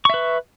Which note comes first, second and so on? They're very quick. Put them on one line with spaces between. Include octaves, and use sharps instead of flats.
C#6 E5 B4